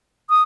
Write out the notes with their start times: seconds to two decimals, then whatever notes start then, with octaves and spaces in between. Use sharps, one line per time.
0.30 D#6